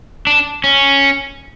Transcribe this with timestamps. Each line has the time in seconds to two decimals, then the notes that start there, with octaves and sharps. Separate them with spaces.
0.27 D4
0.64 C#4